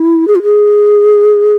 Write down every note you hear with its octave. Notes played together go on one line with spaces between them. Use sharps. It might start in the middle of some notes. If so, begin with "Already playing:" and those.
Already playing: E4
G#4
F4
G#4